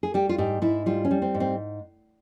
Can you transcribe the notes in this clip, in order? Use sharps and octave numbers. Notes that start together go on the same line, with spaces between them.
G#4
G3 G4
F4
G#2 G4
G#2 E4
G3 F4
C#4
G3
C4
G#2
C4